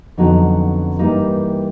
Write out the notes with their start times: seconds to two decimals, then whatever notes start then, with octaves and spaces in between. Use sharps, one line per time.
0.17 F2 D3 F#3 B3 D#4
0.99 G2 E3 G3 A#3 D#4